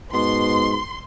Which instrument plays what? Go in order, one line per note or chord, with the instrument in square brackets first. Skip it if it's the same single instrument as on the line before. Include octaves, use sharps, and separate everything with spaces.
[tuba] G#2 [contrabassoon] B2 [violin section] C6